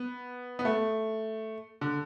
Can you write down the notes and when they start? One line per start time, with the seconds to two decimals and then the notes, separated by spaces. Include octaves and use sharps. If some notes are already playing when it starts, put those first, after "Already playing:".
Already playing: B3
0.59 B3
0.65 A3
1.81 D3